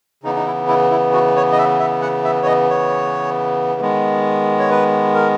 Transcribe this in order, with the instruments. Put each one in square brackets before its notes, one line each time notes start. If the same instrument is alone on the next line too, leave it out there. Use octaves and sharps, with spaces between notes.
[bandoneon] C#3 E3 B3 D#4
D#4
E4
E4
E4
F#4
C#5
D#5
E5
E5
F#5
E5
C#5
D#5
C#5
D#3 G#3 B3
C#5
B4
A#4